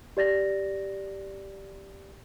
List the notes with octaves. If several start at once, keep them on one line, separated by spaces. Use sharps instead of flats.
G4 D5 A6 A#6